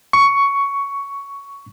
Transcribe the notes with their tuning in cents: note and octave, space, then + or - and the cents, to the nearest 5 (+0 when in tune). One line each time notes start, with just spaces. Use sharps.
C#6 +10